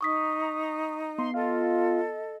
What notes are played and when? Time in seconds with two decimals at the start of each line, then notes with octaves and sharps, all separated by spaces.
0.01 D#4 A#5 C#6 D#6 B6
1.18 B3 C6
1.34 F4 A4 D#5